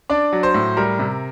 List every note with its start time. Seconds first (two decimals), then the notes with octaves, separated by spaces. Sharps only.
0.10 D4 D5
0.33 F#3
0.43 C5
0.54 A2
0.77 G3 A#4
0.99 C3